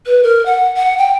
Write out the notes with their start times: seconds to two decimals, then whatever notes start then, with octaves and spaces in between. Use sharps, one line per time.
0.06 B4
0.23 A#4
0.46 F#5
0.76 F#5
0.98 G5